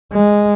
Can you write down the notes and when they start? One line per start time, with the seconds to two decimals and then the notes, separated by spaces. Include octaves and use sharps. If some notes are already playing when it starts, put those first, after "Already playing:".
0.13 G#3